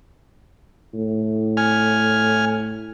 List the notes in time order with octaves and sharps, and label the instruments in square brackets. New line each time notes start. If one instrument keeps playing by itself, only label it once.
[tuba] A2
[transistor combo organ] G#5 F6